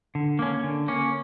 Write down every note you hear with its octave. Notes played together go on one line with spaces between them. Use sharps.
D3
A#3 C#4
D3
A#3 C#4